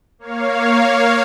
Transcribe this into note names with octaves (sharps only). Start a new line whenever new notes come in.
A#3 C#5 F5